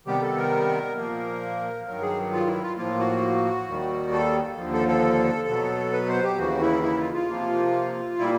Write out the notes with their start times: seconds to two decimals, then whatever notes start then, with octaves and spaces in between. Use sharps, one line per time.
0.06 C3 D#3 G3 B3 G4
0.21 A4
0.37 A#4
0.96 A#2 F3 A#3 A#4
1.87 G2 D#3 F#3 A#4
2.02 G#4
2.32 F4
2.47 E4
2.62 F4
2.77 A2 F3 A#3 F4
2.99 F#4
3.68 D#2 D#3 G3
4.12 A4
4.58 D#2 D3 F3
4.73 A4
4.88 A4
5.48 B2 F#3 B3
5.93 B4
6.08 C5
6.23 G4
6.38 D#2 C#3 E3 F#4
6.61 E4
6.83 E4
6.98 F4
7.14 F4
7.28 C3 F3 A#3
8.19 A#2 G3 A#3 E4